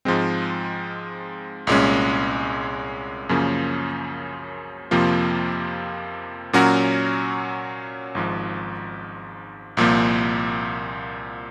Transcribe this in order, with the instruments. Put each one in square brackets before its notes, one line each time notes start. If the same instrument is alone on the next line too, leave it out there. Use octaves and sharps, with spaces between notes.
[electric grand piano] G#2 F3 G#3 C4
C2 A#2 G#3 C#4
F#2 C#3 F3 A#3 C#4
F2 C3 F3 A#3 F4
A#2 F#3 C#4 F#4 A#4
G#1 G#2 F3
C2 A#2 F3 A#3